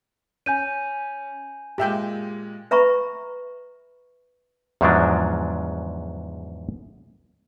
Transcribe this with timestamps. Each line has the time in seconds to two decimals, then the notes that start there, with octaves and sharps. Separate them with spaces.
0.46 C#4 G#5 G6 D#7
1.78 A#2 G#3 G4 E5 G5
2.71 B4 E5 A#5 B5 C#6
4.81 E2 G#2 C#3 F3 F#3 D4